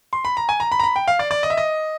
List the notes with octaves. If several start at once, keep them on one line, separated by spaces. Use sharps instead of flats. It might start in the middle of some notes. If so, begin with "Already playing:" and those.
C6
B5
A#5
G#5
A#5
B5
A#5
B5
G5
F5
D5
D5
D#5
E5
D#5